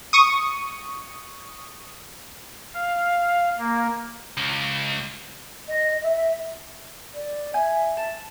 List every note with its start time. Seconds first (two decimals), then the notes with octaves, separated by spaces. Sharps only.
0.13 C#6 D#6
2.74 F5
3.58 A#3
4.37 C#2
5.68 D#5
6.03 E5
7.14 D5
7.54 E5 G#5
7.97 A5